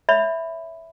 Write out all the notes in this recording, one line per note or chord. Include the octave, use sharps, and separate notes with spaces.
C#5 E5 B5